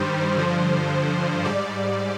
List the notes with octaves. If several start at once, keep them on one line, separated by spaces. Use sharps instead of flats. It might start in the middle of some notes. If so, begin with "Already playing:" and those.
Already playing: G2 D#3 G3 C5
G2 D3 F3
G#2 G3 D5